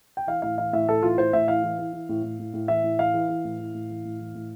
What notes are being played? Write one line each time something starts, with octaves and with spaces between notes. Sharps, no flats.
G5
E3 F5
A2 F5
E3 F5
A2 E5
A2 A4
E3 F4
A2 C5
A2 E5
E3 F5
E3
E3
E3
A2
A2
A2
A2
E3 E5
A2
E3 F5
E3
E3
A2
E3
A2
E3
A2
E3
A2